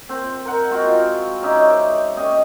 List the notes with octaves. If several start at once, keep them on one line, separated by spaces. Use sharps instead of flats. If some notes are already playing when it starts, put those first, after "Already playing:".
C4 C5
A#4 F#5
G#3 F4 F#4 G5
C#4 D#4 D5 E5
C5 E5
C#4 G4 D#5